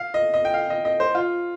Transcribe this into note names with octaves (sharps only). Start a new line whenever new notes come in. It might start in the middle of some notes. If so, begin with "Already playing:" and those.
Already playing: F5
D#5
D#5
G5
F5
D#5
D#5
C5
F4